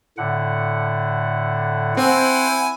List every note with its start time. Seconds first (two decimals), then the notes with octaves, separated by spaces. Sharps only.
0.17 A2 D3 F#5
1.97 C4 E4 C5 F#5 G#5